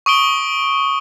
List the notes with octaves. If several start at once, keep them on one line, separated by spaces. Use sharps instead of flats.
C#6 D#6 D7 G7